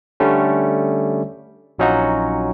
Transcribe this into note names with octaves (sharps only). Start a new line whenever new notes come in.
D3 G3 A3 C#4
A#1 F#3 C#4 D#4 F4 F#4